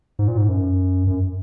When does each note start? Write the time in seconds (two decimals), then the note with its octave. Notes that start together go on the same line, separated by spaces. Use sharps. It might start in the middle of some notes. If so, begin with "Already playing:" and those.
0.19 G#2
0.28 A#2
0.38 G#2
0.49 F#2
1.07 F#2